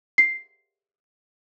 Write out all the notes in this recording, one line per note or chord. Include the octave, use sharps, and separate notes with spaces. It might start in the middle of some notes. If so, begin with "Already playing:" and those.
C7